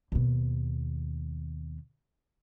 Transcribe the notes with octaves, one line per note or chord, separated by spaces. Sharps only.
D#2 B2